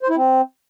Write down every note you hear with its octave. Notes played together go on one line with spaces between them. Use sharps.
C5
E4
C4